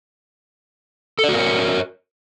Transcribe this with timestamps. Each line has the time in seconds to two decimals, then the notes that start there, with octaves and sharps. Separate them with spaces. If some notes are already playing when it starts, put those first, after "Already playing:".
1.19 A4
1.24 D5
1.29 F#4
1.34 A#4
1.39 C#5